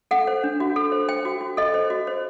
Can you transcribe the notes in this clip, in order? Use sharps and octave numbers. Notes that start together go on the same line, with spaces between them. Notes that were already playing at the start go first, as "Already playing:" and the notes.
A4 F#5
C5
D4
F#4
A4
C5
C5 G5
F#4
F#4
A4 D#5
C5
F#4
C5